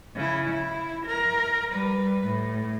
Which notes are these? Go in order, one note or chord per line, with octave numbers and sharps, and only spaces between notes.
C#3 E4
E4
A#4
G3 B4
A2